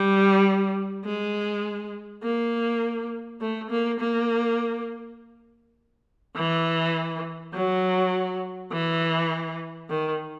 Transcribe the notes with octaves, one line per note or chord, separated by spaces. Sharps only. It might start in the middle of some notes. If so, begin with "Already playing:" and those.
Already playing: G3
G#3
A#3
A3
A#3
A#3
E3
F#3
E3
D#3